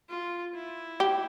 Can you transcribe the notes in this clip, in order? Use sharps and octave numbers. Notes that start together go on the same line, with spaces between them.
F4
E4
G4